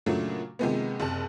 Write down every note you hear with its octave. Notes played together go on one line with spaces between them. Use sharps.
A#2 C#3 F#3 A3 D4
C3 D#3 F3 G#3 A#3 B3
F#1 C3 A5